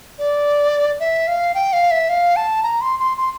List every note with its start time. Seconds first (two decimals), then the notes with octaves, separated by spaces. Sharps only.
0.19 D5
1.00 E5
1.27 F5
1.55 G5
1.73 F5
1.91 E5
2.09 F5
2.36 A5
2.63 A#5
2.81 C6
2.99 C6
3.17 C6